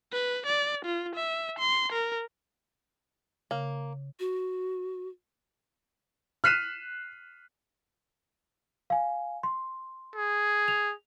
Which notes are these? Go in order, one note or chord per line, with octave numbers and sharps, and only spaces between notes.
B4
D5
F4
E5
C6
A#4
C#3 A#3
F#4
F6 F#6 B6 C7 D#7 E7
F5 G#5
C6
G#4
F7